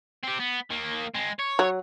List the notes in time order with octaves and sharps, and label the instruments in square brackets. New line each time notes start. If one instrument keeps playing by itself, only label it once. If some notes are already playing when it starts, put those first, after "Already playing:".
[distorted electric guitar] C4 G4
B3
D#3 A#3
G#3 C4
C#5
[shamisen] F#3